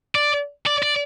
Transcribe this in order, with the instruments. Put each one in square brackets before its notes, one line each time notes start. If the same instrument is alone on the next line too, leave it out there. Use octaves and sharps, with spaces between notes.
[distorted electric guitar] D5
D5
D5